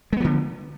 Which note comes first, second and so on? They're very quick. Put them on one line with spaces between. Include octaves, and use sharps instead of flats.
G#3 B3 F3 D3